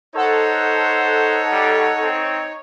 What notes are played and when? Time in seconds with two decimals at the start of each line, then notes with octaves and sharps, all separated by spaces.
0.15 D#4 A4 C5 C#5 F#5
1.51 G3
2.01 C4